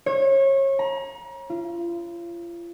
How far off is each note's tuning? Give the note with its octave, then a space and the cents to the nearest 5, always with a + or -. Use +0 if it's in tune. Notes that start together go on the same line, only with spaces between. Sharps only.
C#5 -30
A#5 +35
F4 -35